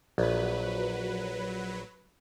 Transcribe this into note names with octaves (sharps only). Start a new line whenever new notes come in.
A#1 F#3 B4